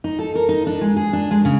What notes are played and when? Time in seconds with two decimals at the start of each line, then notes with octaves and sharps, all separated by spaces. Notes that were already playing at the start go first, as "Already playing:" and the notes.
0.04 D#4
0.19 A4
0.35 A#4
0.49 D#4
0.67 D4
0.81 G#3
0.96 G#4
1.13 D4
1.31 G#3
1.45 C#3